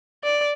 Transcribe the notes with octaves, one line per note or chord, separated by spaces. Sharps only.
D5